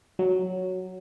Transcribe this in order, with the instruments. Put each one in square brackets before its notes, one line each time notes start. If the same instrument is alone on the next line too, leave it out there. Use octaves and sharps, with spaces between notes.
[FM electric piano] F#3